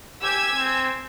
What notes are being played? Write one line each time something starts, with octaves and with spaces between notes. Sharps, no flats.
G4 G#5 E6 G#6
C4